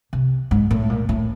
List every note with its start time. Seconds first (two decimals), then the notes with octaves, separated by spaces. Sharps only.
0.13 C3
0.51 G#2
0.71 A2
0.90 A#2
1.09 A2